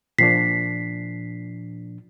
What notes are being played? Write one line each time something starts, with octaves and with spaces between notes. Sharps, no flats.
A#2 F3 D4 B6 C7